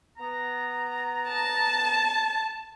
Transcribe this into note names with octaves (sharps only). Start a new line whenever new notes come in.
B3 A#5
A5